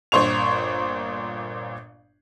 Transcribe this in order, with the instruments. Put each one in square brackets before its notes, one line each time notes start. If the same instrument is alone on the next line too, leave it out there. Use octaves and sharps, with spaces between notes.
[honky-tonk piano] G1 A#2 C5 C#6 F7